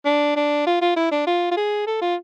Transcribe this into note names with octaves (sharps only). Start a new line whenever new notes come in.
D4
D4
F4
F4
E4
D4
F4
F4
G#4
A4
F4